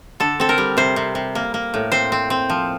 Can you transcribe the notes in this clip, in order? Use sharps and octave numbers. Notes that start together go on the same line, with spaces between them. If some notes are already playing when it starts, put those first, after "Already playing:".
D3 A4
C4 A4
A#4
G3
C3 C5
C3
C3
A#3
A#3
A2
C4 C5
C4
C4
F3